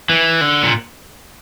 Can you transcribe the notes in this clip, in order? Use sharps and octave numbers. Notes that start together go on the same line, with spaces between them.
E3
D3
A#2